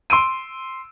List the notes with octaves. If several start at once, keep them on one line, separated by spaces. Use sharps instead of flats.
C6 E6 D7 D#7